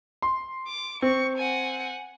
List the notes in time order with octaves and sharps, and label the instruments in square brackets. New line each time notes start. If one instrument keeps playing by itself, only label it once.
[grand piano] C6
[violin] D6
[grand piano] C4 [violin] C#6
[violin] F#5 G#5